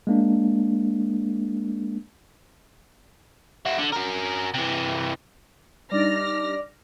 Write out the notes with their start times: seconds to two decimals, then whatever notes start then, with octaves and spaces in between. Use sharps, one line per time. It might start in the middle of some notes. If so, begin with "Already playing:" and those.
0.07 G#3 A#3 D4
3.65 E4 F#4
3.78 D3
3.92 F#4 A#4
4.54 C3 E3
5.91 G3 D4 D#4 D5 F6 A#6